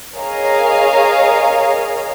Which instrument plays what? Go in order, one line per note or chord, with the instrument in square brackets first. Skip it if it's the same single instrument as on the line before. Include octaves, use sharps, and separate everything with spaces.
[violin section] G#4 A#4 C#5 D#5 F5